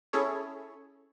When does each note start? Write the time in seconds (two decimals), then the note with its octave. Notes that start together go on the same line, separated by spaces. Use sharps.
0.13 C#4 E4 G#4 A4 C#5